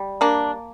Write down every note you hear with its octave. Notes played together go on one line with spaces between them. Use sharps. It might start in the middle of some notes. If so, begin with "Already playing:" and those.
Already playing: G3
A#3 D4